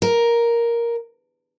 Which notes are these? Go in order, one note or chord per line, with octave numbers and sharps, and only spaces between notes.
A#4